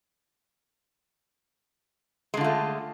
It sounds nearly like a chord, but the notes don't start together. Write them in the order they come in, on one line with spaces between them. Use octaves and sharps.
G#3 D3 F4 A3